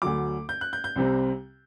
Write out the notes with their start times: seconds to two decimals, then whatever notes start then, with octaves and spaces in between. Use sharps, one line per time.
0.02 D2 D3 F#3 D6
0.49 G6
0.61 F#6
0.73 G6
0.84 G6
0.96 C2 C3 G3 C4